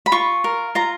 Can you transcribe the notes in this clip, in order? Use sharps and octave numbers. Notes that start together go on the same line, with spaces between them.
B5
F4 C#6
A#4
F4 A#5